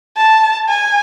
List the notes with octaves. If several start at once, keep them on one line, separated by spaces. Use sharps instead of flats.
A5
G#5